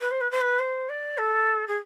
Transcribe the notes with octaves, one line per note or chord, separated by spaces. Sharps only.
B4
C5
B4
C5
B4
C5
D5
A4
G#4